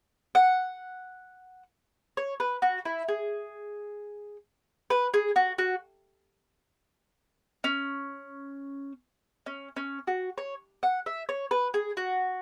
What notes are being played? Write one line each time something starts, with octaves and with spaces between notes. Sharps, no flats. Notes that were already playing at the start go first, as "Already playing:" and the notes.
F#5
C#5
B4
F#4
E4
G#4
B4
G#4
F#4
F#4
C#4
C#4
C#4
F#4
C#5
F#5
E5
C#5
B4
G#4
F#4